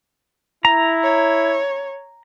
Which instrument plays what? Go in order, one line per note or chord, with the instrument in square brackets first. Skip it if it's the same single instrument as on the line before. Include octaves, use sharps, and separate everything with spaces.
[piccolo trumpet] E4 [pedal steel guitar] A#5
[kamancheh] C#5